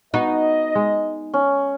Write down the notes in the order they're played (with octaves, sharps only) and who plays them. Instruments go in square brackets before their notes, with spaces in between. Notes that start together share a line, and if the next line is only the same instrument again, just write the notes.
[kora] B3 F#4 [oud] D#4 [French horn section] D#5
[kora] G#3
[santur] C#4